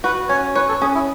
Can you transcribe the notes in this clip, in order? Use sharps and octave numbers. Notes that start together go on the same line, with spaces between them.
F#4 B4
C#4 C#5
B4 C#5
A4
C#4 G#4
E4